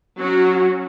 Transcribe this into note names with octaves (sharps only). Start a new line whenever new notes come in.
F#3 C#4 F#4